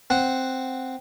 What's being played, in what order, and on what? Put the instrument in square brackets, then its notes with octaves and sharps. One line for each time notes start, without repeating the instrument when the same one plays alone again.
[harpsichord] C4 F#5